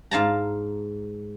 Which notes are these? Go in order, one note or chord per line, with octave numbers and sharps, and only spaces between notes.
G#2 F5 A5 A#5